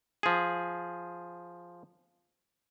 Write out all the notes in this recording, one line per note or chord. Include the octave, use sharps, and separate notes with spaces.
F3 G#4